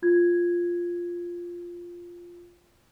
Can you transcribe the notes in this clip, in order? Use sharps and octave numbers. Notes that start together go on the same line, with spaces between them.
F4 G#6